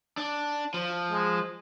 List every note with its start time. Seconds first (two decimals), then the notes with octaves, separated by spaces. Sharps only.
0.17 D4
0.74 F3
1.12 G#3